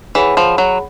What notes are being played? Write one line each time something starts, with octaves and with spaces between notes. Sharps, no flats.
E3 G#4 C#5 F#5 B5
F3
F#3